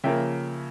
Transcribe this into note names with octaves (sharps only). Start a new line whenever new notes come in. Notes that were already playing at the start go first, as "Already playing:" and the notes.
C#3 F3 A#3 E5 G5